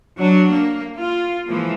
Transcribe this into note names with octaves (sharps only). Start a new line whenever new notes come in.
F#3 D4
A#3
F4
E3 F3 G#3 A#3